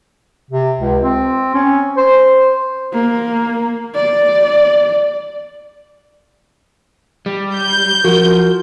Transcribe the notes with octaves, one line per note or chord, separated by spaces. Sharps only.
C3
C#2
C4
C#4
C5
A#3
D5
G3
G6
F3 F#4 A#4